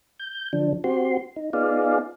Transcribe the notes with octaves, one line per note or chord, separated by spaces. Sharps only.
G6
D3 F3 D4
C4 F#4 G4 C6
D#4
B3 D#4 F4 G#4 D5 F5